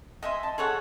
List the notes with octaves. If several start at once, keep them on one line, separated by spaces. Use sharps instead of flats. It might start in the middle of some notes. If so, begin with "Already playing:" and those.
D#5 E5 G#5 C6
A5
G#4 A4 C#5 F#5